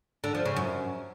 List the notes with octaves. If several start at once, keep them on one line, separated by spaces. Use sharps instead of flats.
D3
F3
C#3
F#2